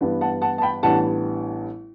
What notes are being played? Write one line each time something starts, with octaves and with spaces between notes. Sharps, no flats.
G2 E3 B3 D4
F#5 A5
F#5 A5
A5
G5 B5
A1 A2 G3 B3 D4 F#5 A5